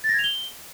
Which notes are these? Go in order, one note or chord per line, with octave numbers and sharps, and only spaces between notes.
A6
A#6
G#6
F7
G7